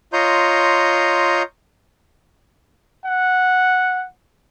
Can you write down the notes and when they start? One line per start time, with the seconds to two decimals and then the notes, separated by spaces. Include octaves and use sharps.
0.13 F4 C#5 D#5 A#5 C6 G6
3.05 F#5